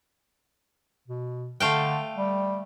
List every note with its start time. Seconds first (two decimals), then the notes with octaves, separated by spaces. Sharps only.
1.08 B2
1.60 D3 A3 F5 G5
2.16 G3